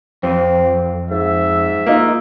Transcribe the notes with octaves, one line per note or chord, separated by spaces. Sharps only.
F2 C4
G#2 E5
A#3 D#4 F4